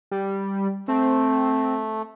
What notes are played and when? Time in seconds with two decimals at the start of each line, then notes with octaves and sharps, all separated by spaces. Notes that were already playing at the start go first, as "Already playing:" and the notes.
0.11 G3
0.88 A3 C4